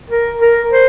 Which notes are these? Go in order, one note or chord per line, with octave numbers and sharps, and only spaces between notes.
A#4
A#4
C5